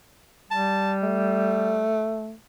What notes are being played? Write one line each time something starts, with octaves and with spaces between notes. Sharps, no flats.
G3 A5
A3